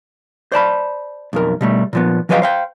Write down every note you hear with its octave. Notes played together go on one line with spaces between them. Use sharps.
C5 D5 A5 B5
B1 F2 A#4
B2 G3 A3
A#2 F3 B3
F3 F#3 B4 D#5 F5 G5
C5 F5 G5